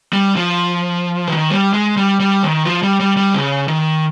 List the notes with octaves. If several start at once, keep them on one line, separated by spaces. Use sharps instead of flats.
G3
F3
D#3
G3
G#3
G3
G3
D#3
F3
G3
G3
G3
C#3
D#3